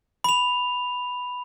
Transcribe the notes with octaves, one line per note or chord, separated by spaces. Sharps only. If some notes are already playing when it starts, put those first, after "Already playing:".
B5 F7